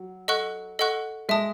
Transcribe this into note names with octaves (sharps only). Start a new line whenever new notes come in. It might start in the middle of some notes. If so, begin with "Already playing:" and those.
Already playing: F#3
A4 D#5 F#5 C#6 F#6
A4 D#5 F#5 C#6 F#6
G#3 E5 A5 D#6